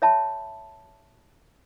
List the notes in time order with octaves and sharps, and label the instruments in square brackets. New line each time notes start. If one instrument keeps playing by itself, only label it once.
[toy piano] C#5 E5 A5 B5